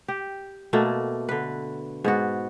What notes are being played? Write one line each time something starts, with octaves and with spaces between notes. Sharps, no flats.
G4
B2 A3 A#3
D3 B4
G#2 B3 F#4